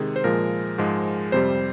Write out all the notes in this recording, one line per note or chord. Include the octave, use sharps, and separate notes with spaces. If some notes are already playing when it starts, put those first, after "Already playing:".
Already playing: C3 D#3 G#3 G#4
C5
A#2 F3 G#3 A#4
G#2 F3 G#3
F2 C3 G3 C5